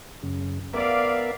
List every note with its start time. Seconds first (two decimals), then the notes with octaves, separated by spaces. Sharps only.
0.23 F#2 C#3
0.73 B3 A#4 D5 E5 F5